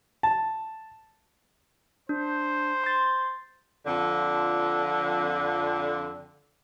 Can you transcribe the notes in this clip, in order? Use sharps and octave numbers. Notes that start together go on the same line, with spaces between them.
A5
D4 C5
C6 A6
F2 D3